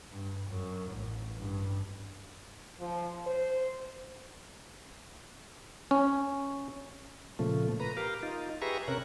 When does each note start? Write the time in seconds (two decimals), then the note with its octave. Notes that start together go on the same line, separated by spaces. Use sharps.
0.11 G2
0.47 F#2
0.92 A1
1.34 G2
2.80 F3
3.26 C5
5.91 C#4
7.39 A#2 C#3 F3 A3
7.80 B4 A#5
7.97 G4 A#4 F5
8.23 D#4 F4
8.62 G4 G#4 B4 E5 A#5 C#6
8.88 C3 C#4 A#4 F#6